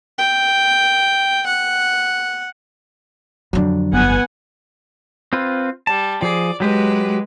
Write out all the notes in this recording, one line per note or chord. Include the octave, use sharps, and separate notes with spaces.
G5
F#5
F2 D3 F#3 D4
G1 B3 F#5 G#5
C4 F4 B4
G3 A5
F3 G#4 D5
F#3 G#3 G4 B4